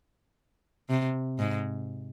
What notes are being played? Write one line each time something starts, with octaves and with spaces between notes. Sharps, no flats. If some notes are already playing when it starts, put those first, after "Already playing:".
C3
G#2